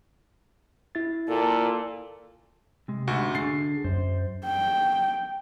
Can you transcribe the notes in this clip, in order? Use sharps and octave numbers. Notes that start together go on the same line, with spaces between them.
E4 A6
A#2 A4
C3 G#3
D2 G#2 F#4
D3 G#4 A6 C7
F#2 C5
G5